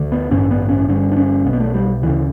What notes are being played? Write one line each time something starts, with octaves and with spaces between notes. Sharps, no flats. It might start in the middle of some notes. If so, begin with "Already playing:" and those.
Already playing: D2 D3
B3
A1 G2 D3 C#4
B3
C#4
G1 G2 D3 C#4
D4
C#4
B1 B2
B3
A3
G3
D2 C#3 E3